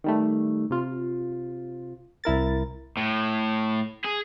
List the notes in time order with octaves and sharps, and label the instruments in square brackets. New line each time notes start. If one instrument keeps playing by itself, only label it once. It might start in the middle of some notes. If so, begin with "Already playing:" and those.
[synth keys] D#3 G3 A3
C3 F4
C2 E4 A#4 A6
[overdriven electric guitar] A2
G#4